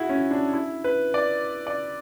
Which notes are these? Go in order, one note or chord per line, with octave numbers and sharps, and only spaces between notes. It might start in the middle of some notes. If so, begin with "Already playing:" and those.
Already playing: E4 F#4 G#4
C#4
D4
E4
B4
D5
D5